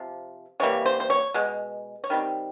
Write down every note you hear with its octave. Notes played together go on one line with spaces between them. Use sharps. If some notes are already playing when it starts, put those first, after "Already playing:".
Already playing: C3 F3
C3 E3 G3 A#3 C#5
C5
C5
C#5
B2 G#3
C#5
D#3 G3 C4